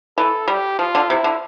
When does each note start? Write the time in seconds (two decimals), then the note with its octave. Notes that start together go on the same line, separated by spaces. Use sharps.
0.18 E3 A4
0.48 G3 G4
0.79 F3 F4
0.95 D3
1.10 C3 E4
1.24 D3